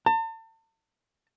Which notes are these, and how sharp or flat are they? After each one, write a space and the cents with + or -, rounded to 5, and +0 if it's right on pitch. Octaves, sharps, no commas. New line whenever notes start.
A5 +40